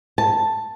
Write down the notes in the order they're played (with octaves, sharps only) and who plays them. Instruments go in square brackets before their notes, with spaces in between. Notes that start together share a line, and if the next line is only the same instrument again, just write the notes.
[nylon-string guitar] A5